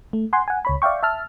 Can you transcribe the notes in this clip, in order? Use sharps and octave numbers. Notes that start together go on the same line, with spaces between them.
A3
F#5 G#5 C6
F#5 G#5
C#2 C#5 B5
D5 E5 F5 G5 C#6
E5 A5 F6